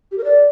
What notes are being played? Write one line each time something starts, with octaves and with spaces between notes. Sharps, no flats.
G4
A#4
D5